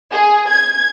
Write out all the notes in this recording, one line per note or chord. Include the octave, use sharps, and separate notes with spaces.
G#4
G#6